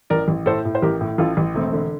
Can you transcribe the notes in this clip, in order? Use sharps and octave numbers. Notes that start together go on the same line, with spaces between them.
A1 A#4 D5
A1
A2 A4 C5
A2
C5
A1 G4 A#4
A2
A1 F4 A4
A1
E1 A3 C4
D3